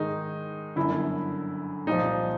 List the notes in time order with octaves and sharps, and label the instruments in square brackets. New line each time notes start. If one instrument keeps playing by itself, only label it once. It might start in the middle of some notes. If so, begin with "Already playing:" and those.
Already playing: [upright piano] G#2 D#3 G#3 [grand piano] D#4
[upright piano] G1 F#2 D3 [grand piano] E4
[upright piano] C2 A#2 F3 [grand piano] D#4